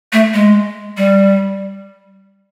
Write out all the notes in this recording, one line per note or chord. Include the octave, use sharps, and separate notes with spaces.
A3
G#3
G3